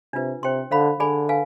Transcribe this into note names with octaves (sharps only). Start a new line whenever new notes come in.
C3 D4 F4 B4
C3 C5 G5 C6
D3 C5 F5 B5
D3 G#4 D5 G#5 B5
B4 F5 G#5